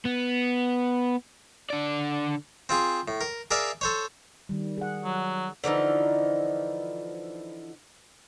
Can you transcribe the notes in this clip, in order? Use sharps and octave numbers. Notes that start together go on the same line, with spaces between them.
B3
D3 D5
C4 F4 G#4
A2
A#4
G#4 A#4 D5 E5 F5
A4 C5 C#5
D#3 G3
G#4 F#5
F#3
D3 E3 F3 D#4